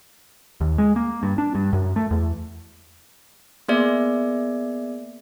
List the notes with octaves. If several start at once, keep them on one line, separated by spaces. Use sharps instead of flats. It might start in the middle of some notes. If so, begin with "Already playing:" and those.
D#2
G#3
A#3
G2
D4
G2
F#2
A3
E2
A#3 B3 G#4 D5 E5